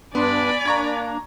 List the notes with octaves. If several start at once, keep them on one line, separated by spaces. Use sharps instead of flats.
G2 B3 D4 D5 G#5 B5 C6
A#3 D4 A#5 C#6 G#6